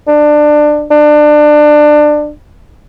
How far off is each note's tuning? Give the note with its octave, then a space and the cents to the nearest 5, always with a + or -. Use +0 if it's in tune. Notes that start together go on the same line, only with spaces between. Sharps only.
D4 +20
D4 +25